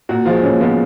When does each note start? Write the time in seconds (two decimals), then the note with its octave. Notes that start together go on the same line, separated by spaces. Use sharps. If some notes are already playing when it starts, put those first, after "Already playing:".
0.09 A#2 F#4
0.26 F3 G#3 F4
0.43 A#2 C#4
0.60 F3 G#3 B3